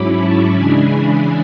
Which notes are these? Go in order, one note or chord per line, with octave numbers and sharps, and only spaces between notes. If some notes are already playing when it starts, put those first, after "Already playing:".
Already playing: G#2 F#3 C#4 E4 B5 D6
A5 C#6
C#3 E3 G#3 D4 G#5 B5